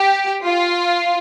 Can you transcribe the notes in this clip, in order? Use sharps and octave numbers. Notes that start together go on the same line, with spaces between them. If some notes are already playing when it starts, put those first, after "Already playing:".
Already playing: G4
F4